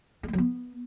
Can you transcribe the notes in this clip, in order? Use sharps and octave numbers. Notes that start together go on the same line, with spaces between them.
G#3
A3
F#3
B3